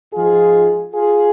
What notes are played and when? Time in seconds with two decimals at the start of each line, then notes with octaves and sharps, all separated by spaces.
0.13 G#2 F3 F4 G#4
0.93 F4 G#4